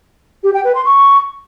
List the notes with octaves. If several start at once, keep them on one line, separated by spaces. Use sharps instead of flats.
G4
G5
B4
C6
C#6